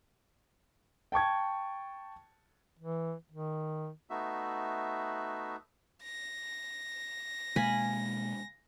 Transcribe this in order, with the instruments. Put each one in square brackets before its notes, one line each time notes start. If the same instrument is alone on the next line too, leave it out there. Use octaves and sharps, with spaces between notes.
[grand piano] G5 A5 C#6 G#6
[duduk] E3
D#3
[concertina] A3 B3 D#4 F#4 E5
[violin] A#6
[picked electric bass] B2 G#3 A#3 [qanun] F5 G#5 B5